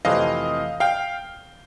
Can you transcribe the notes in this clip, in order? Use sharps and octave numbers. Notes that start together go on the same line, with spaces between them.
F2 C3 E3 A3 C4 D#5 F5
F5 G5